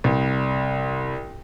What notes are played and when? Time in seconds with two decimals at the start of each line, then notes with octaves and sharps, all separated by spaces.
0.04 C2